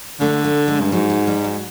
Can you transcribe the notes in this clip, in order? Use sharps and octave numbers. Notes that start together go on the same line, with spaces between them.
D3 A3
A3
G#3
G2
G#2 F#3
F#3
G3
F#3